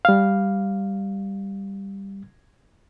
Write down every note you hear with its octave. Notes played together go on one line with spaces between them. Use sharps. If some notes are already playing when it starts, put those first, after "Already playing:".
G3 F5